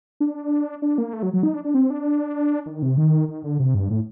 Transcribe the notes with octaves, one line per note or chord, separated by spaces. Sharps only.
D4
D4
A#3
A3
F#3
F#3
D#4
D4
D4
C4
D4
D#3
C3
D#3
D#3
D3
C3
G2
A2